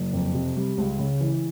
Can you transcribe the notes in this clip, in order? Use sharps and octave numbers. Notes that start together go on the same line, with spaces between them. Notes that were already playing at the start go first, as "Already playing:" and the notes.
Already playing: F#1
F2
C3
G3
C#2
C#3
E3